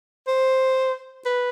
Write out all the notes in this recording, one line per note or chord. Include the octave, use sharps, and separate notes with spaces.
C5
B4